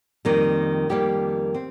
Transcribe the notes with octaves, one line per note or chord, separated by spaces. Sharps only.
F2 D#3 G3 A#3
F2 D#3 G3 A#3 G4
C4